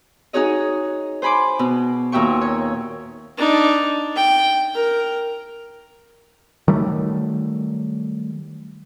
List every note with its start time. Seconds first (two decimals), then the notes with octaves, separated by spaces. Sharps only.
0.33 D#4 F#4 G#4 C#5 D#5
1.22 C5 G#5 B5 C6 D6
1.59 B2
2.12 D#2 A#2 F#4 E5 G5 C#6
2.41 C#5
3.37 D4 D#4
4.15 G5
4.75 A#4
6.68 D#3 F#3 G3 A3